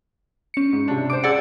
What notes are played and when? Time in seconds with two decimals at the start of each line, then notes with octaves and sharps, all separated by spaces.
0.54 C#4 C#7
0.73 G#2
0.88 C3 D4
1.10 C5 D6 D7
1.24 G#4 D5 F#5 E6 A6 C#7